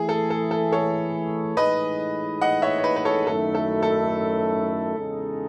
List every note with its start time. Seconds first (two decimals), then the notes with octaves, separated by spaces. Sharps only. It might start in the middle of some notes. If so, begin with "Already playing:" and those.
Already playing: E3 A3 E4 G#4
0.09 A4
0.30 A4
0.51 A4
0.72 A4 C#5
1.57 A2 E3 G#3 D#4 G#4 B4 D#5
2.41 D#5 F#5
2.62 C#5 E5
2.78 C#5
2.83 B4 D#5
2.96 B4
3.05 A4 C#5
3.26 F#2 D#3 A3 E4 A4
3.55 A4
3.82 A4
4.96 E2 C#3 G#3 D#4